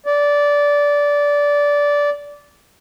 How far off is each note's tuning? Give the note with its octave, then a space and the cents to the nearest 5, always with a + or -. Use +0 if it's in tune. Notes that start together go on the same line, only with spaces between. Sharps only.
D5 -15